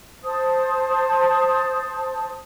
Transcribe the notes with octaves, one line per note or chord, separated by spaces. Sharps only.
C5 A5 D#6